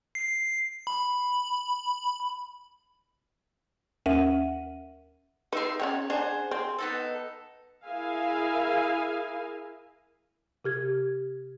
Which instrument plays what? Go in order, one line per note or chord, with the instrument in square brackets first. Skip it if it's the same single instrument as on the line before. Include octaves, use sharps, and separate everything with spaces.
[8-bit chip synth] C7
B5
[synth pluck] D#2 C#4 A#4 E5 F#5 D#7
[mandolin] D#4 E5 C6 [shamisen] B4
[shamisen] C#4 F#5 G5 [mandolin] C#5
[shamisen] D4 [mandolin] G#4 C5 F#5
[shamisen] C4
[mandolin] B3 D#4 A4
[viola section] E4 G#4 A#4 E5 F5 G#5
[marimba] C3 G4 G#6